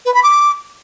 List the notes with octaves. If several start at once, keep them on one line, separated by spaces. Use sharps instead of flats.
B4
B5
D6